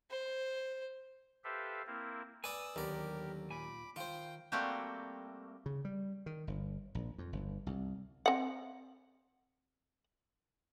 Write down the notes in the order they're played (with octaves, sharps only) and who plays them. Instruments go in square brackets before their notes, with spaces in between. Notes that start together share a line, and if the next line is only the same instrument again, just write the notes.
[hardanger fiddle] C5
[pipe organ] G4 A4 B4 C5 E5 F5
A#3 C4 E4 A#4
[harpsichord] B4 D5 [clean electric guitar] G#5 [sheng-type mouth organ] D#6 E6
[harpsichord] D#2 D5 [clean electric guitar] D3 F#3 B3 [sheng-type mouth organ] G4 A#4
[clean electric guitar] A#2 G#5 [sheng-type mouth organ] B5 D6
[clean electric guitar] D#3 [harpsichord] F4 C5 [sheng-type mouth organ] G5
[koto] G3 A3 A#3 C4 F#4 G4
[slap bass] C#3
G3
D#3
G1
A#1
F2
G1
C2
[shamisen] C4 F#5